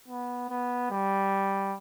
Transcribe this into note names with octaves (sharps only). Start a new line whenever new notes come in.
B3
B3
G3